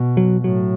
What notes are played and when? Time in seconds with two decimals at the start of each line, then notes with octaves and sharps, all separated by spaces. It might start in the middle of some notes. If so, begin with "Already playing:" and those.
Already playing: B2
0.17 F#3
0.44 A2 F#3